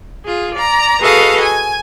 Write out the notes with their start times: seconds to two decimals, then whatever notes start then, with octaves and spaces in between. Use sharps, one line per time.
0.24 F4 G#4
0.54 D5 A#5
1.00 F#4 G#4 A4 B4 D#5 F5
1.43 G#5